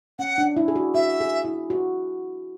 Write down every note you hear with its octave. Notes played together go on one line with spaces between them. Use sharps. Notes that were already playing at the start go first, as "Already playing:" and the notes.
C#4 F#5
D4
E4
G#4
F#4
F#4 E5
G#4
E4
F#4